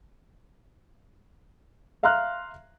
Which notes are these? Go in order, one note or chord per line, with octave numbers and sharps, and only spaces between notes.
E5 F5 A#5 C6 F6 F#6